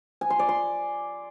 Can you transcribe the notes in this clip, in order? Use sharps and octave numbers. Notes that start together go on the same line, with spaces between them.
G#5
C6
D5
C6